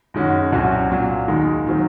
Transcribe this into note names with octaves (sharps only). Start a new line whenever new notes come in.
F#2 D#3 G#3 C#4 F#4
C2 C3 F#3 C#4 F#4
A#2 F#3 A#3
D#2 D#3 G#3 D#4
D#3 F#3 C4